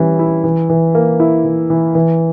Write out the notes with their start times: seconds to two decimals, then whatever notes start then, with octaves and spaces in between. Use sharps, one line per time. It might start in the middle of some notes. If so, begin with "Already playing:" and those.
Already playing: E3 G3 C#4
0.19 E4
0.44 E3
0.70 E3
0.95 A#3
1.20 E4
1.45 E3
1.70 E3
1.95 E3